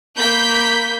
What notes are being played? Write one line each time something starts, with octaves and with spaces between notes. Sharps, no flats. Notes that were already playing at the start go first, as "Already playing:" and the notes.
A#3 B5 G6 B6